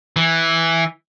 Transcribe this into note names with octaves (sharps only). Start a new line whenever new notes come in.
E3